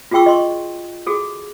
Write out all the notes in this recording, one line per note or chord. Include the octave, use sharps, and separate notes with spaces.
F4 F#4 G#4 G5 C#6 E6
D#5 C6 C#6
F#4 G#4 A4